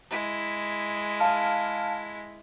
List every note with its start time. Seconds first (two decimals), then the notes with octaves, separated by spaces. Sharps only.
0.10 G#3 E4
1.20 F5 A5 F6